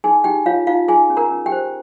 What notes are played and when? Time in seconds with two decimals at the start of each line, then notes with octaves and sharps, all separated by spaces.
0.04 D#4 G#4 G#5
0.24 D#4 G4 G5
0.46 F4 C#5 F5
0.67 D#4 F4 F5
0.88 F4 G#4 G#5
1.10 C#4
1.17 A#4 A#5
1.31 C#4
1.46 G4 G5
1.52 C5